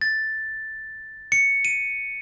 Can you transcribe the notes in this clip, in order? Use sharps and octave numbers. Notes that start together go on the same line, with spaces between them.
A6
C#7
D#7